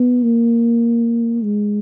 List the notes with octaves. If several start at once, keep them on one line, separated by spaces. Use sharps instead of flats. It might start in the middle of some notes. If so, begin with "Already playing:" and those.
Already playing: B3
A#3
G#3